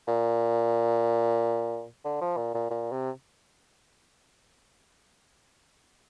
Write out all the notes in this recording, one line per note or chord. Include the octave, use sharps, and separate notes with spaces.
A#2
D3
F3
A#2
A#2
A#2
C3